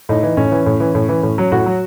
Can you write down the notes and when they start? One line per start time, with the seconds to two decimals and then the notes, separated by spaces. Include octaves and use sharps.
0.09 A2 D#4
0.23 E3
0.37 A2 C#4
0.52 E3
0.66 A2
0.80 E3
0.95 A2
1.09 E3
1.23 A2
1.38 F#3
1.52 A2 F#4
1.66 F#3